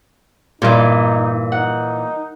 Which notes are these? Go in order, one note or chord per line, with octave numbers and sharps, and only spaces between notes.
G2 A#2 E3 D#4 A#4 D6
D#4 F#5